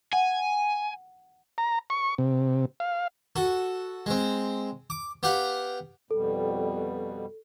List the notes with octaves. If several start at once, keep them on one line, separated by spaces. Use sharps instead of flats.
F#5 G#5
A#5
C#6
C3
F5
F#4 A4
G#3 C4
D6
B3 G4 F5 F#5
F2 B2 G3 A4